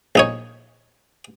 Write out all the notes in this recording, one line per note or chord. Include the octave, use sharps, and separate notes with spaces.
A#1 D#4 C#5